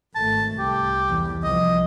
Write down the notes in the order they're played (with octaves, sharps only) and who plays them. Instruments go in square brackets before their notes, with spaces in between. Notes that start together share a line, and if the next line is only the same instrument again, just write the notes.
[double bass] G#1 A3 [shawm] A5
[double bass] C2 [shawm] G4
[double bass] E2
[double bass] C2 F3 [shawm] D#5